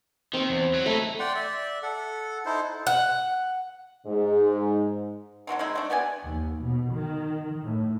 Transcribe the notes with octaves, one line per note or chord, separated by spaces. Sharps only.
D#3 C4 C#6
E2
F#3
A3 D#4 E4
D5 F#5 G5 C6
D5 E5
A4 F#5
D#4 E4 A4 C5
F#5
G#2
D3 F#3 C4 D#4
G#3 C4 D#4 E4
A3 D4
B3 G4 D5 G#5
D#2
B2
D#3
A2